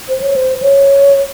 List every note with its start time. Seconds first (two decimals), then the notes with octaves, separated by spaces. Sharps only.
0.09 C5
0.22 C#5
0.36 C5
0.62 C#5